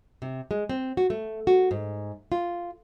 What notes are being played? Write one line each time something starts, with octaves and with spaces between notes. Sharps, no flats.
C3
G#3
C4
F#4
A3
F#4
G#2
F4